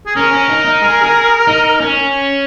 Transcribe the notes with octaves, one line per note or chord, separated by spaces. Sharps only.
G#4
C#4 A#4
C#4
D#4
D#4
G#4
G#4
D#4
C#4